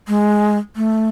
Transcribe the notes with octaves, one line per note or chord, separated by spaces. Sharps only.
G#3
A3